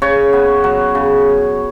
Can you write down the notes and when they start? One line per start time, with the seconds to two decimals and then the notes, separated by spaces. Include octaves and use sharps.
0.02 C#3 C#5
0.33 B3
0.64 F#3
0.95 C#3